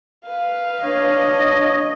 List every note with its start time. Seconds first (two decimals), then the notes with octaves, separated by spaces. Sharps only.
0.25 B4 F5
0.83 D4 C#5 D#5